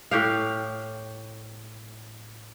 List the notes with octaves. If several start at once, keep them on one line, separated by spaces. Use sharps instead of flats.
A2 G4 F5